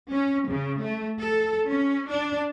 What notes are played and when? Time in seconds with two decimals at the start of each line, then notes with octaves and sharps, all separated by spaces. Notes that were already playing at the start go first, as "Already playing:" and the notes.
0.11 C#4
0.48 C#3
0.81 A3
1.19 A4
1.68 C#4
2.10 D4